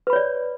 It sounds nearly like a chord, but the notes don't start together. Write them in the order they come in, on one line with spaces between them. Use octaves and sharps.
B4 B5 C#5 D5